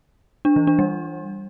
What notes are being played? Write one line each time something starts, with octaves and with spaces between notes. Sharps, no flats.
D4
E3
D4
G3